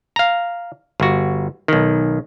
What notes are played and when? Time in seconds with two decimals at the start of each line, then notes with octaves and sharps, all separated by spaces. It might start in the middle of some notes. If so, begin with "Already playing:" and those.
0.16 F5 A#5
1.00 G1 F#4
1.68 B1 D#3